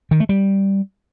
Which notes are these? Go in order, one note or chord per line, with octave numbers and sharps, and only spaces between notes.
D#3
A3
G3